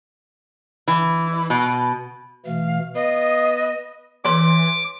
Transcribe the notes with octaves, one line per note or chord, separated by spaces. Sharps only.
E3
B2
B2 E3 A3 F5
B3 D#5 F5
E3 B4 C#5 C6 D6